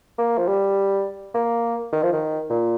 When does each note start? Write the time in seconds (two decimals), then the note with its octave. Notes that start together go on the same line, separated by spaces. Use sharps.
0.18 A#3
0.37 F3
0.48 G3
1.34 A#3
1.92 D#3
2.03 F3
2.13 D#3
2.50 A#2